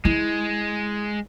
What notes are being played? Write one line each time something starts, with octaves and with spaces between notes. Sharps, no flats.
G#3 E4